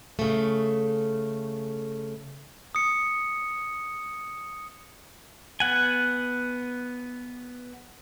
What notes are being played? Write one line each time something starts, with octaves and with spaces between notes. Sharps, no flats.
C#3 A3
D#6 C#7
B3 F#5 G#5